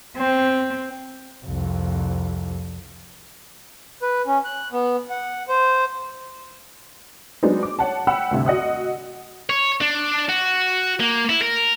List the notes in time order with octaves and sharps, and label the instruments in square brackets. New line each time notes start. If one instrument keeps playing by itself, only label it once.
[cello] C4
[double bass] C2 F2
[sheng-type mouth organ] B4
C#4
F#6
B3
F#5
C5
[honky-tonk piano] F#3 G#3 B3 C4 D4 D#4
D6
C#5 F#5 A5
F#5 G5 B5 E6
D2 G2 C3
F#4 D#5 F#5 D#6
[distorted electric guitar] C#5
D4
F#4
A#3
E4
A#4